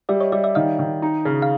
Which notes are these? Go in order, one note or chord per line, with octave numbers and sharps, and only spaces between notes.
G3 D5 E5
C#5 D#5
G3 D5 E5
D5 E5
D#3 D#5 F5
D#3
D#4
C#3
F5